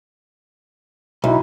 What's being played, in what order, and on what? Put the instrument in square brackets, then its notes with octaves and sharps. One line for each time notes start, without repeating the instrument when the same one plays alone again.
[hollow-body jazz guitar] B1 [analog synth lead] E4